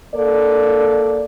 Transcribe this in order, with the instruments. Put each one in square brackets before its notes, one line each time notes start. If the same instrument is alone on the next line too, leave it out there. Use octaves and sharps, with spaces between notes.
[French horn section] A#3 A4 D5